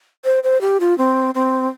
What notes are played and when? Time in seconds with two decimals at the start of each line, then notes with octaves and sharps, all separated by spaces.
0.25 C5
0.43 C5
0.61 G4
0.80 F4
0.98 C4
1.35 C4